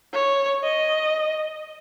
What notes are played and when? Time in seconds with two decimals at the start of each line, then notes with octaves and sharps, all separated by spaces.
0.14 C#5
0.64 D#5